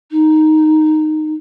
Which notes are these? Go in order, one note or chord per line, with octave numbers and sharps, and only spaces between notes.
D#4